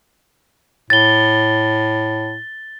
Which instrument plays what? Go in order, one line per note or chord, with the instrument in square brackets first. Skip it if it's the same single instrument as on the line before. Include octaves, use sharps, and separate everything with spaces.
[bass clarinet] A2 [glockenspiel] A6 G7